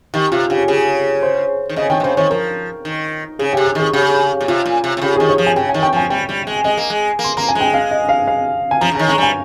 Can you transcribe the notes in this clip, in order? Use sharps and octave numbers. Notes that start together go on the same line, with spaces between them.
D#3 G4
C3 F4
C#3 G4
C#3 G#4
C5
D#3
C#3 D#5
D#3 G5
C3
C#3 C5
D#3 C#5
F3 A#4
D#3
C#3 G#4
G4
C3
G4
D#3 G#4
C#3 G4
A#2
C3 F4
A#2
C3
C3
C#3 G4
D#3 G#4
C#5
F3
G#5
C#3 G5
G#5
D#3
G5
F3 G#5
G3 G5
G3
G#3
G#3 D#5
A#3
G#3
A#3
C6
A#3 A#5
G#5
G#3
G5
F5
D#5
F5
F5
G#5
F3 A#5
C#3
D#3 A#5
G#3 A#5
G3 G#5